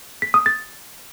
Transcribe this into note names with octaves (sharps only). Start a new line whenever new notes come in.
B6
D#6
A6